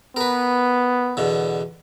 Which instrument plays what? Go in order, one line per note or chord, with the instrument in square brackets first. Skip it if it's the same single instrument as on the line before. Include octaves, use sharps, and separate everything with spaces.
[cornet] B3 [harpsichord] A#4 B4
[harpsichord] E2 B2 D3